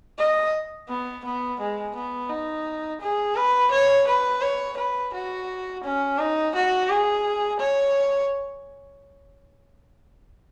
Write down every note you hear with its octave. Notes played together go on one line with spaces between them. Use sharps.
D#5
B3
B3
G#3
B3
D#4
G#4
B4
C#5
B4
C#5
B4
F#4
C#4
D#4
F#4
G#4
C#5